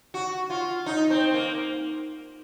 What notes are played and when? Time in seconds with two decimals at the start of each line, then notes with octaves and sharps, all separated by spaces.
0.14 F#4
0.50 F4
0.86 D#4
1.10 C4
1.34 A#3